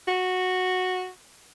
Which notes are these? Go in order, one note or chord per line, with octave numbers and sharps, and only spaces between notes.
F#4